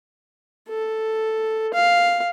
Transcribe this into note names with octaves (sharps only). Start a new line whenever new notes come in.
A4
F5